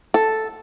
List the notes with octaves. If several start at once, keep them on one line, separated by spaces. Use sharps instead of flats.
A4